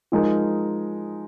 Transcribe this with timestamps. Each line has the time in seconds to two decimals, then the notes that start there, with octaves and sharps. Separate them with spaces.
0.12 F3 G#3 D#4 A#4